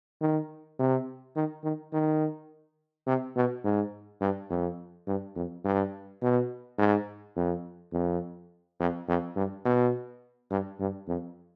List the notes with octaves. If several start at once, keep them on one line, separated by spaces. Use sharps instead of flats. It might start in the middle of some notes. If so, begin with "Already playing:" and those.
D#3
C3
D#3
D#3
D#3
C3
B2
G#2
G2
F2
G2
F2
G2
B2
G#2
F2
F2
F2
F2
G2
B2
G2
G2
F2